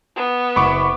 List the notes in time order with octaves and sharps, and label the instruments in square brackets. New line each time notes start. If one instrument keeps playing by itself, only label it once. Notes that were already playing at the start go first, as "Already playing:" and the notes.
[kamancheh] B3
[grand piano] F#1 F#5 [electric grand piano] B5 C#6 D6